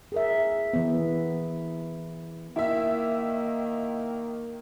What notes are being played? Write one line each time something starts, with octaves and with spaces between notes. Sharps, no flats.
G#4 A#4 E5
E3 B3
D#3 A#3 E4 E5